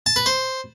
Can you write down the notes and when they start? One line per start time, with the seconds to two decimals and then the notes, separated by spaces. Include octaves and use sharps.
0.06 A5
0.16 B4
0.26 C5